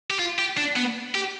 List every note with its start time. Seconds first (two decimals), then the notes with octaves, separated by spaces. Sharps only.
0.10 G4
0.19 F4
0.38 G4
0.57 D4
0.76 B3
1.15 G4